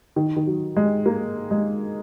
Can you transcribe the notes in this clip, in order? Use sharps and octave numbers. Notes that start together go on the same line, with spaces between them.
D#3
D#3
F#3
G#3
A#3
G#3